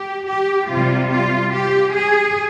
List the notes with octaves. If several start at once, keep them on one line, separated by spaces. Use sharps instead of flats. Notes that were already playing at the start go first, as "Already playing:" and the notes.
Already playing: G4
G4
C3 G3 F4
F4
G4
G#4